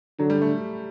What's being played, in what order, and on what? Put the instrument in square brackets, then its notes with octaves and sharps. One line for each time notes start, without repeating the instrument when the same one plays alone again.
[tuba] D3 [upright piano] F#3
[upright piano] G3
A3